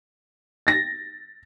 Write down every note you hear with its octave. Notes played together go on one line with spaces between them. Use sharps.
A6 A#6